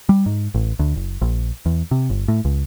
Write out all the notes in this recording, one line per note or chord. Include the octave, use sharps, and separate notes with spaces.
G3
G#2
A1
D2
F#1
A#1
E2
C3
G1
A2
C#2